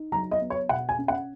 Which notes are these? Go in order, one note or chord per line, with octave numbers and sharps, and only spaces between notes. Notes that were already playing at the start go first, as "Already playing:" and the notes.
Already playing: D#4
F#3 A#5
D#5
B3
C#5
B2 F#5
G#5
C#4
F#5